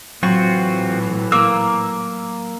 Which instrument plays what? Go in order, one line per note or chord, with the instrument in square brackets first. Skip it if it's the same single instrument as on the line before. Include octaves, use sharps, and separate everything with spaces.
[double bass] A2 E3 [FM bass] F#3 [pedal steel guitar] C4 F4 F#4 [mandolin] C#6
[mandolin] A#3 [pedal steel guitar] E6